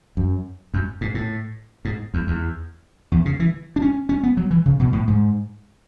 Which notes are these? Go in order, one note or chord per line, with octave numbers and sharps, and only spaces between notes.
F#2
F#2
G#2
A2
G#2
E2
E2
E2
C#3
E3
D4
C#4
C#4
B3
F#3
E3
C#3
B2
A2
G#2